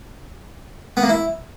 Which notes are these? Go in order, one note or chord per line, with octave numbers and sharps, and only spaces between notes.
B3
A#3
E4